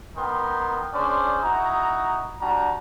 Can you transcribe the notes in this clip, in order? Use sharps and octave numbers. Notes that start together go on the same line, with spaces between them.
B3 D#4 A#4 G5 C6
C#4 D4 G#4 C5 D5
D#4 E4 F#4 A#5
G3 D4 F#4 A5 A#5